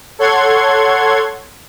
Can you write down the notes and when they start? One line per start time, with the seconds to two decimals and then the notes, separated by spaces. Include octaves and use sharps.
0.19 A4 C#5 F#5 C6 G#6